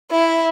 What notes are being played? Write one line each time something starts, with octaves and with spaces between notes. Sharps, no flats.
E4